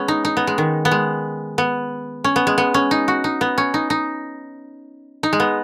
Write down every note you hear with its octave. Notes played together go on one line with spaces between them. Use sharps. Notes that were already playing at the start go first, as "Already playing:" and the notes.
Already playing: G#3 B3 C#4
D#4
D#4
B3
G#3
D#3
B3
G#3
B3
C#4
B3
G#3
B3
C#4
D#4
F#4
D#4
B3
C#4
D#4
D#4
D#4
G#3
B3